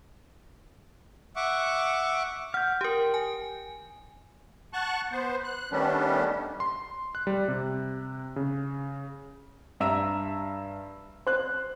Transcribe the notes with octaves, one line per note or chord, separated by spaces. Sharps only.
E5 F#5 C#6 D6
F#5 F6 G6
G4 A#4 G5
G#5
F#5 A5 C#6 F#6
B3 C5
F#6
D#3 G3 A3 B3 C#4 D4
C6
F#6
G3
C3
C#3
G2 E5 A#5 E6 E7
C5 F#6